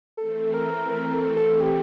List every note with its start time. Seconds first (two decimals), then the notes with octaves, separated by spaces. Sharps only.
0.18 E3 A3 C4 A4
0.54 A#4
0.89 A#4
1.13 A4
1.37 A4
1.60 G4